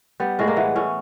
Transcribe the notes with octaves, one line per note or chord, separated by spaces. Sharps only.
G3 B3
A2 G#3
A#3
E3 B3
A2 C#4